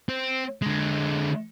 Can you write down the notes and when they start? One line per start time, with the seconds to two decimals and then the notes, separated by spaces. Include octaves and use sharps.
0.09 C4
0.62 D3 G#3